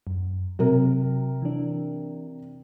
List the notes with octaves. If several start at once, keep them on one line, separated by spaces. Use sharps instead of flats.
F#2
C3 F#3 A#4
E3 D4